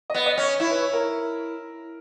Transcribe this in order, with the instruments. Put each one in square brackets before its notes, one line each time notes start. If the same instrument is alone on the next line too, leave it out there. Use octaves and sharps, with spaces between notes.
[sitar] B3 [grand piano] D#5
[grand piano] D#5
[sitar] C#4
[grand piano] C#5
[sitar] E4 [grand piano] C#5
[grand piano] B4
C#5
A#4